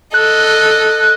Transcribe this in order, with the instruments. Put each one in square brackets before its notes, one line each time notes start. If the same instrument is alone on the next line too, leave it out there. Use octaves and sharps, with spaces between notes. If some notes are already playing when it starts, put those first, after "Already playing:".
[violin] A4 D#5 [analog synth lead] F#6